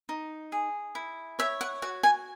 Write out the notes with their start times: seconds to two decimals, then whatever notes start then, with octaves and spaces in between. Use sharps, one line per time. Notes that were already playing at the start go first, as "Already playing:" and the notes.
0.09 D#4
0.52 G#4
0.95 E4
1.39 C#5 E5
1.61 F#5
1.82 F#4 F#5
2.03 G#5